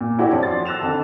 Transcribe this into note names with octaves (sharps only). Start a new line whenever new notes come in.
A#2
D4 E4 F#4 G4 C#5 D5
F2 F3 D5
C6 A6
E6 F#6 A#6 E7 F7
F2 D3 D#3 A5